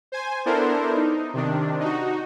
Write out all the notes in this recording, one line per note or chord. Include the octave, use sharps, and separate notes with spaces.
C5 G#5
B3 D4 E4 A4 A#4 C5
D#4
C3 D#3 D4
D#4 F#4